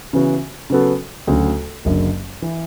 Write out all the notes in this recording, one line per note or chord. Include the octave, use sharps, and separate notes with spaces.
C#3 E3 B3 F#4
C#3 F#3 B3 F#4 A4
D2 C#3 F#3 A3
F#1 F#2 D3
E3